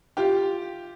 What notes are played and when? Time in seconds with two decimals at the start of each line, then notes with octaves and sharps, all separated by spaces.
0.17 F4 G4